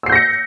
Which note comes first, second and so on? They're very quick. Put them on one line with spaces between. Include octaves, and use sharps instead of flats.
E6 C7 G6 A#6 C#7